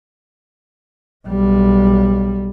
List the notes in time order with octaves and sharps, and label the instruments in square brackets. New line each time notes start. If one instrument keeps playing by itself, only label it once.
[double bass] B1 G3